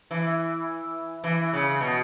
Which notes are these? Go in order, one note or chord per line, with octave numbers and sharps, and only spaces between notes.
E3
E3
C#3
B2